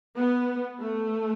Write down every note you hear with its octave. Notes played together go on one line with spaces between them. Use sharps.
B3
A3